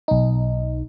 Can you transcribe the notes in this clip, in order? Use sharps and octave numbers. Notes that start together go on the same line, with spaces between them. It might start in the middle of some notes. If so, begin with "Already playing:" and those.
B1 D#4